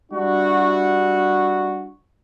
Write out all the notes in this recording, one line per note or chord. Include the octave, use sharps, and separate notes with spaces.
G3 D4 E4 F#4